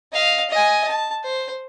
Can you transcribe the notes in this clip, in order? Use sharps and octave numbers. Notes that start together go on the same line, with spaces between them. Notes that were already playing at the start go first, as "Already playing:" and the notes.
D#5 F5
D#5 G#5
A5
C5